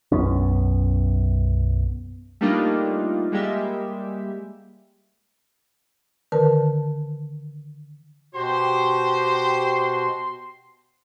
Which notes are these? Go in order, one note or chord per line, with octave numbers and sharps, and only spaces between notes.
B1 F#2 B3 C#4
G3 A3 A#3 D4 D#4 F4
G3 G#3 A#3 G4 E5
D3 D#3 A#4 B4 A5
B2 F#4 G4 C5 C6